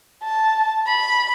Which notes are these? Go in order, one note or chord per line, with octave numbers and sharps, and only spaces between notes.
A5
B5